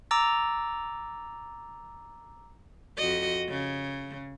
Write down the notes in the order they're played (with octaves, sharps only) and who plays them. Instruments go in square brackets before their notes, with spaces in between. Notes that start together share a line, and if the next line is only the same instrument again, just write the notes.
[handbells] A#5 D6 E6 A6
[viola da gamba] F2 F#4 D#5
C#3